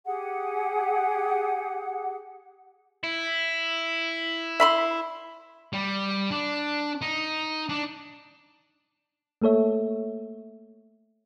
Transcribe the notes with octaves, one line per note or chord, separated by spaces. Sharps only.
G4 G#4 F#5
E4
E5 B5 C6
G3
D4
D#4
D4
A3 A#3 A4 C#5 E5